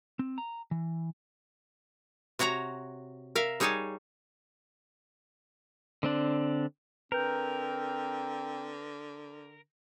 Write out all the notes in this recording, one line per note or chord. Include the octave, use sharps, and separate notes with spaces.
C4
A#5
E3
C3 F#4 C#5 F#5 A#5
A#4 E5 F5
G3 D#4 G#4 C#5 G#5 A5
D3 C4 D4
D3 C4 A#4 B4 G6